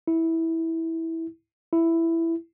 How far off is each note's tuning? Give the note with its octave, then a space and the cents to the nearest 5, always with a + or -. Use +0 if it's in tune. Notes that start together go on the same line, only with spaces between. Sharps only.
E4 -15
E4 +5